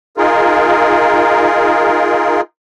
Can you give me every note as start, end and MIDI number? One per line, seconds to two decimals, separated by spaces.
0.18 2.41 63
0.18 2.41 65
0.18 2.41 68
0.18 2.41 70